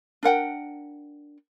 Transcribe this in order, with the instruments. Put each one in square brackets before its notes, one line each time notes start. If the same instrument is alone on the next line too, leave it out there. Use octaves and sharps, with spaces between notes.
[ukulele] D4 A#4 F#5 G5